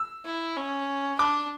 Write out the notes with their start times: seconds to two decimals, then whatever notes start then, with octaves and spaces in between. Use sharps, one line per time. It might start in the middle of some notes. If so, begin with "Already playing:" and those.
Already playing: E6
0.25 E4
0.57 C#4
1.19 D4 D6